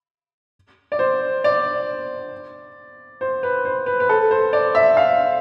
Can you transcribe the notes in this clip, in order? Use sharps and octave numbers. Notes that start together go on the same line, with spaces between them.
D5
C5
D5
C5
B4
C5
B4
B4
A4
C5
D5
E5
F5